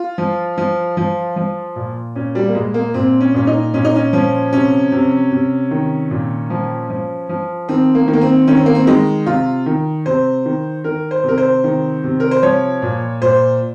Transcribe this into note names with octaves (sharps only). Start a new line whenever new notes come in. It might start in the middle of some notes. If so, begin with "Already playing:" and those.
Already playing: F4
F3
F3
F3
F3
A#2
A#2 C#4
G3
A#3
A#2 G#3
A#3
A#2 C4
C#4
A#2 C#4
D#4
A#2 C#4
D#4
C#4
F3 C#4
C3 C#4
C3
C3
D#3
A#2
F3
F3
F3
D#3 C4
A#3
D#3
A#3
C4
D#3 C#4
C4
A#3
C4
D#3 G#3
C3 F4
D#3
C3 C5
D#3
D#3 A#4
C5
C3 A#4
C5
D#3
C3
A#4
C5
F3 C#5
A#2
A#2 C5